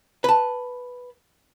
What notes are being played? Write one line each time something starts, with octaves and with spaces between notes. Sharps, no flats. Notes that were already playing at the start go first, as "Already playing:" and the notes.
B4 A5